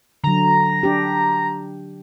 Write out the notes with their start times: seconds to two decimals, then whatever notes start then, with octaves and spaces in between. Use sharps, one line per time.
0.24 D3 F#3 A#5
0.83 D4 G4